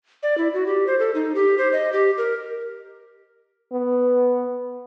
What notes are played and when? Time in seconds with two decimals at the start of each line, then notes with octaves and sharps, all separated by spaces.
0.23 D5
0.38 E4
0.54 F#4
0.67 G4
0.87 C5
0.99 A4
1.15 D#4
1.35 G4
1.58 C5
1.73 D#5
1.92 G4
2.18 A#4
3.73 B3